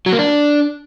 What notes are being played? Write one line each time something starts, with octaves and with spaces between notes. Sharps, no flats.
F#3
A#3
D4